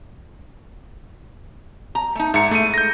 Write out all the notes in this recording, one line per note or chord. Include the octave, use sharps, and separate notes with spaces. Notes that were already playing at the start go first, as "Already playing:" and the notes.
A#5
A3 D#4
G#2 E5 A#5 C#7
A3 E4 G#4 D#7
G6 A#6